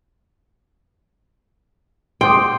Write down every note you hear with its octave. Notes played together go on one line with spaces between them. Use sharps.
G5 C6 D6 D#6